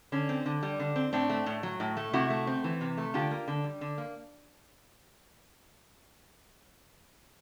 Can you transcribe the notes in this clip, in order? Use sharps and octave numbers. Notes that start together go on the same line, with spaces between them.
D3 C#4
C4
D3
G3
D3
C4
A2 C4 D4
A3
A2
F#3
A2
A3
C3 E4 F#4
A3
C4
E3
C3
A3
D3 F4 G4
A#3
D3
G3
D3
A#3